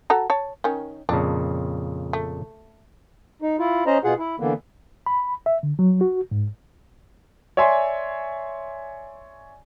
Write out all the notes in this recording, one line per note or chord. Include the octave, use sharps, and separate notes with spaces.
F#4 A4 A#5
C#5 A5
D#3 C#4
F2 A#2 C#3 D4
A3
D#4
E4 F4
C#4 C5 D#5 A#5
B2 F4 G#4 F#5
E4
D3 E3 A#3 B3
B5
E5
D3
F#3
F#4
G#2
C#5 D5 E5 G#5 C6